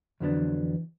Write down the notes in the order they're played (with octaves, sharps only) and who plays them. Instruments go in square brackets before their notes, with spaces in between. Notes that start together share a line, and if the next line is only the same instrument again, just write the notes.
[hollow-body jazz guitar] F2 D3 F#3 B3 D4 [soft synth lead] E3